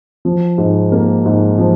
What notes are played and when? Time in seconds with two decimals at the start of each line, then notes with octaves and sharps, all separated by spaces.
0.25 F3
0.58 G#2
0.92 A#3
1.26 G#2
1.58 F3